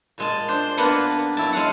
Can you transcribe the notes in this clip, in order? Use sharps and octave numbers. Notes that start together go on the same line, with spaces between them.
A#2 G#3 A5
D4 C5
A#3 B3 D4 B4 F#5
F#3 E4 A5
G#3 F5 F#5